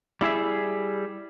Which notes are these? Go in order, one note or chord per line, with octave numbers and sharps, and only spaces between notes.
G3 E4 G#4 E5